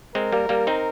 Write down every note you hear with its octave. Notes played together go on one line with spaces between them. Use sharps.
G#3 C4 A#4
G3 A#3
G3 A#3
C4 D#4